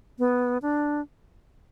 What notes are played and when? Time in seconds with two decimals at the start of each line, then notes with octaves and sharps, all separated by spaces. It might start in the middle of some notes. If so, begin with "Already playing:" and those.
0.19 B3
0.62 D4